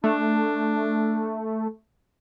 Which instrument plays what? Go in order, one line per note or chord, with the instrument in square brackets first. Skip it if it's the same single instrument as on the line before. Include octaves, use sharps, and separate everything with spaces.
[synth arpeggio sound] A3 [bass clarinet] D4